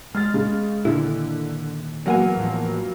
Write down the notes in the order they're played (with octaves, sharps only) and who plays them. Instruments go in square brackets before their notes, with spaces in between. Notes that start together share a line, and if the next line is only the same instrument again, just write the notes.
[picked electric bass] G#3 [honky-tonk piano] F6 A6
[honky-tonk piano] C#3
[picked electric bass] A#2 [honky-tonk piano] D3 [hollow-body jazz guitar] D#3 E4
[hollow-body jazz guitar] E2 F#5 G#5 [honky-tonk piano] F#3 A#3 B3
[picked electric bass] A2 F3